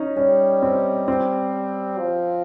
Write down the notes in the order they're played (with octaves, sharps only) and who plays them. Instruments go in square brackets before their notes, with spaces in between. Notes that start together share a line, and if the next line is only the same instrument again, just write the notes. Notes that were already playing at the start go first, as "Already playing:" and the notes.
Already playing: [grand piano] C#4 D#4
[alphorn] G3 [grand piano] C#4
[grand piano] C4
C4
[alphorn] F3